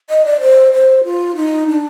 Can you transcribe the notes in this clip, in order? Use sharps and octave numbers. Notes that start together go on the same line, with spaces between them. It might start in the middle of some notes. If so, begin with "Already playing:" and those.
D#5
D5
C5
C5
F4
D#4
D4